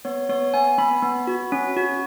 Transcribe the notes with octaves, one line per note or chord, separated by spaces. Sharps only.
B3 C#5
B3 C#5
B3 G#5
B3 B5
B3
F#4
C#4
F#4